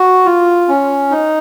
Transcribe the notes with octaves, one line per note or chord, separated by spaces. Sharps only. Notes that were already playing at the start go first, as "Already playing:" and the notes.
Already playing: F#4
F4
C#4
D#4